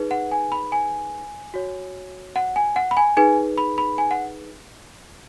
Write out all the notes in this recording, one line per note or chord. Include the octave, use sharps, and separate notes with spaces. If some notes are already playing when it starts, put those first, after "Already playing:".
Already playing: D#4 G#4 B4
F#5
G#5
B5
G#5
F#4 C#5
F#5
G#5
F#5
B5
G#5
D#4 G#4 B4 G#5
B5
B5
G#5
F#5